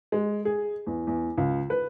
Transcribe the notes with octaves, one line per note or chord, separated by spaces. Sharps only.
G#3
G#4
E2
E2
C#2
B4